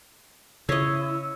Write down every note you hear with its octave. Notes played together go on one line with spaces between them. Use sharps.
C#3 E4 C#5 D#5 E6